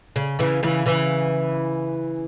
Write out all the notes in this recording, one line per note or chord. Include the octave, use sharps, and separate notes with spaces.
C#3
C#3 E3
C#3 E3
C#3 E3